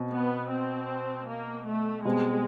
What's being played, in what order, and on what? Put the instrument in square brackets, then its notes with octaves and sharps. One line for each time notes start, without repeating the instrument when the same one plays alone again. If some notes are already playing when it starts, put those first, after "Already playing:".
Already playing: [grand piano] B2 C4
[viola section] B3
C4
A#3
A3
[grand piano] B2 G3 C4 [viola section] G#3